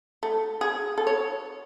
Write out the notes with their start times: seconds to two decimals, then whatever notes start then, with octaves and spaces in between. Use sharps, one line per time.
0.23 A3
0.61 G#4
0.98 A4
1.07 C#5